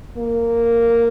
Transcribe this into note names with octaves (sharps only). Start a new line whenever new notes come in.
A#3